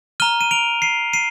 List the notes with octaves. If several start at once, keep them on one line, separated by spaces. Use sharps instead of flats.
A#5 F6 D#7 G7
D#7
D7 F7
C7 D#7
C7 D#7